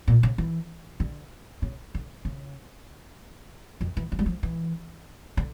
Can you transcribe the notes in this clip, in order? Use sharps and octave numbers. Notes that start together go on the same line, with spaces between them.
A#2
C#3
E3
D3
C#3
D3
C#3
F2
E3
F3
G3
F3
E3
D3